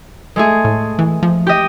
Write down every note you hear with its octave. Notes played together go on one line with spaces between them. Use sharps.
G#3 A3 G#4
A2
E3
F3
G4 D#5